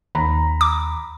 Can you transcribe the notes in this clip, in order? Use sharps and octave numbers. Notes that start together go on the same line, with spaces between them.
D#2 A#5 B5
D6